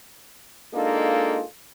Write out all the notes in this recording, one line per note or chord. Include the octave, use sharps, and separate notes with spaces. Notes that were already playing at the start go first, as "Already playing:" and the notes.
G#3 A#3 D4 D#4 F4 A4